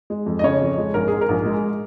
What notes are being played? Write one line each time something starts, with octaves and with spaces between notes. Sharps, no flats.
G#3
F2
D#5
C#3 C#5
F2
G#3
A#1 A#4
G#2 G#4
A#4
A#1
G#3